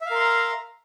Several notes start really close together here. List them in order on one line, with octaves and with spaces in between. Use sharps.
E5 F5 A#4 C6 A#5